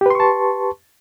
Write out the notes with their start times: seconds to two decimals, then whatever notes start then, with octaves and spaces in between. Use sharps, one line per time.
0.01 G4
0.06 B4
0.10 C6
0.15 C#6
0.20 A5